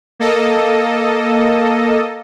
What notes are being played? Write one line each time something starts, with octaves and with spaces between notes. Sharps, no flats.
A#3 A4 D#5